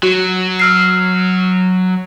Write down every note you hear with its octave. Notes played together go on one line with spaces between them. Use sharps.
F#3 F#4
E6 F6 C7